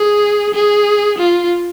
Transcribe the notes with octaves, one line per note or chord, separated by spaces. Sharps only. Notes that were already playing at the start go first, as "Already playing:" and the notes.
Already playing: G#4
G#4
F4